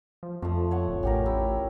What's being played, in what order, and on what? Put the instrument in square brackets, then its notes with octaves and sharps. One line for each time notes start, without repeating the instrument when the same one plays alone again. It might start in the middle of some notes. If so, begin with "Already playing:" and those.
[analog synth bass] F3
[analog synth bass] F2 [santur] F3 A3
[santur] C#5 F#5
[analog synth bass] D1
[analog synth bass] A1 [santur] C#4 G4 A#4
[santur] E4